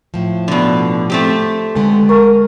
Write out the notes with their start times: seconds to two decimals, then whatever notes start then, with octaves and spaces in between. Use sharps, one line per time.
0.14 A2 F3
0.48 B2 D3
1.10 A3 C4 G4
1.75 D3 G#3 B3
2.09 G#4 A#4 C#6